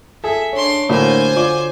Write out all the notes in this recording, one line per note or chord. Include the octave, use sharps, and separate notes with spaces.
G#4 A4 E5
D4 C#5 C6
A2 D3 A#3 F#4 C5 D5 G#5
F4 D5